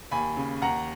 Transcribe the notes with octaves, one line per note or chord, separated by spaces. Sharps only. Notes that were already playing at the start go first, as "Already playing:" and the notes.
D#2 G#5 B5
C#3
D#2 F#5 A#5